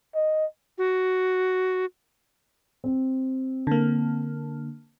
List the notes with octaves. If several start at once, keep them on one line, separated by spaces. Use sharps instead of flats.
D#5
F#4
C4
D3 A#3